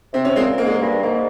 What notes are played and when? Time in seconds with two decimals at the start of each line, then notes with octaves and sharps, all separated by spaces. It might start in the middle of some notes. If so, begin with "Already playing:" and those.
0.14 C3 C4
0.25 C#4
0.36 A#2 G#3 C4
0.58 G#2 A#3
0.66 G#3
0.74 A#3
0.81 G2
1.03 G#2 A#3